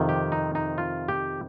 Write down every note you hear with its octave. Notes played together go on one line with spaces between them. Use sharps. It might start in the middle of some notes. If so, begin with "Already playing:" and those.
Already playing: F2 C3 D#3
G4
D#4
D#4
F4
G4